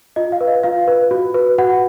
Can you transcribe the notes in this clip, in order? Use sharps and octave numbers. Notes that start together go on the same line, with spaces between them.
F4 D#5
F5
B4
D#5
F4 F5
B4
F#4
B4
F#4 F#5